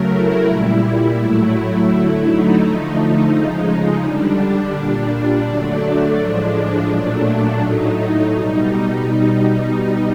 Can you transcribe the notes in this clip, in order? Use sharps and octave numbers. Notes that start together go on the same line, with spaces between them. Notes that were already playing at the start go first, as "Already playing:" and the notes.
Already playing: C#3 F#3 A3 A#4
E4
A#2 G3
A2 F#3 A3
D3 F#3 A3 E4
D#4
D3 F3 A3
C#3 F3 G#3
D3 G3 D4
A#2 G3 D4
D3 F#3 A3
A2 F3 G#3 D4
A#2 F#3 A3
A2 F#3 A3 D#4
B2 G3